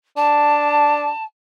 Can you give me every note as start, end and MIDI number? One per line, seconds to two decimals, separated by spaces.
0.17 1.08 62
0.17 1.24 81